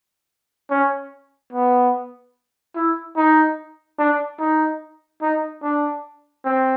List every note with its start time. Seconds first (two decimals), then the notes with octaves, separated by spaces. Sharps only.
0.71 C#4
1.53 B3
2.76 E4
3.17 D#4
3.99 D4
4.40 D#4
5.22 D#4
5.63 D4
6.45 C4